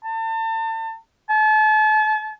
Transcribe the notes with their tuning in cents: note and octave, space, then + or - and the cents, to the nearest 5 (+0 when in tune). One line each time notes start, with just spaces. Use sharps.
A5 +35
A5 -40